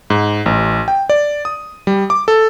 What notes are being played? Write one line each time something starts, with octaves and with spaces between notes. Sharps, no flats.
G#2
A1
G5
D5
D#6
G3
D6
A4